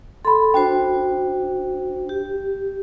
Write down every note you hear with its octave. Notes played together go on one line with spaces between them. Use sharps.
A4 B5 C6
D4 F#4 C5 G5
G4